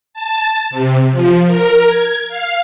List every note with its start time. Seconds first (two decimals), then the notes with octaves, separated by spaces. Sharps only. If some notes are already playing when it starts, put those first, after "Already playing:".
0.14 A5
0.70 C3
1.12 F3
1.47 A#4
1.87 G#6
2.28 F5